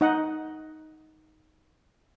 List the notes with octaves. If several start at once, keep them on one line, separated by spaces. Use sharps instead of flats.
D#4 D#5 F#5